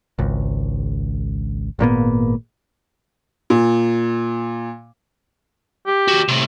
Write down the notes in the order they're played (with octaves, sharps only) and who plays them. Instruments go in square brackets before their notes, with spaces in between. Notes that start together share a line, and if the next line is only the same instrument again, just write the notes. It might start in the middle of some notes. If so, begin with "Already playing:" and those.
[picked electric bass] G#1 C#2
G#1 A#2 A#3 B3
[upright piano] A#2
[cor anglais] G4
[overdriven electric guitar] D#2 F#4
A2 C3